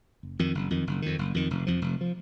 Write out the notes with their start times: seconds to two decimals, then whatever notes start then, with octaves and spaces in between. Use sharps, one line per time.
0.23 F#1
0.39 F2 D#3
0.55 F#1
0.70 F2 D#3
0.87 F#1
1.02 F2 D#3
1.19 F#1
1.34 F2 D#3
1.50 F1
1.67 F2 F3
1.82 F1
2.01 F3